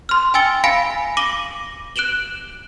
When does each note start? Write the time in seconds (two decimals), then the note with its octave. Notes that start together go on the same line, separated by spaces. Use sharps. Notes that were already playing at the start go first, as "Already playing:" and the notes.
0.09 C6 F6
0.34 G5 G#5 E6 A6 C#7 G7
0.64 F5 G#5 B5 A#6 C#7 D7
1.17 D6 A#6 D#7 F#7 G7
1.96 F#6 D7 E7 F#7 G7